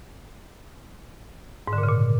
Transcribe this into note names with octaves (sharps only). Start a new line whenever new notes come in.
G#2
D3
A#2
C#3
A#2